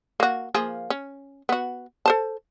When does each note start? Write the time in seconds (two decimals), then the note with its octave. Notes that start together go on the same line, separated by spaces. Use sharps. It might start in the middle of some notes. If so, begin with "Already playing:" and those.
0.20 A#3 F#4
0.54 F3 A#3 G#4
0.90 C#4
1.49 B3 F#4
2.06 A4 C5 A5